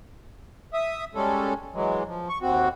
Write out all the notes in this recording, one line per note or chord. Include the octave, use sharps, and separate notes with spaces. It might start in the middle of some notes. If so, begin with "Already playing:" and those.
E5 D#6
G3 G#3 C#4 A4
E3 F#3 G#3
F3
C#6
D#2 C4 F#4